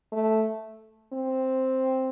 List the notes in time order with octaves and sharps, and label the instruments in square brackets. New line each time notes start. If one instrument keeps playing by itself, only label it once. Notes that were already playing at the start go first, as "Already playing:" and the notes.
[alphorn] A3
C4